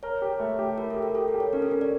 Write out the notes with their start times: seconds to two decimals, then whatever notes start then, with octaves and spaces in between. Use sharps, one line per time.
0.03 A#4 C#5
0.22 G4
0.40 A3
0.59 G4
0.78 E4 A#4
0.90 A4
0.97 G4
1.02 A#4
1.15 G4 A4
1.28 A#4
1.34 G4
1.40 C#5
1.53 C#4 A#4
1.62 A4
1.71 C#4 A#4
1.81 D5